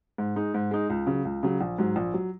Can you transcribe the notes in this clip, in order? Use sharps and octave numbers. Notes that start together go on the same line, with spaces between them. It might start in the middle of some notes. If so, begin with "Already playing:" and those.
G#2
G#3 D#4
G#2
G#3 D#4
C#2
C#3 F#3
C#2
C#3 F#3
A#1
G#2 F#3
A#1
F#3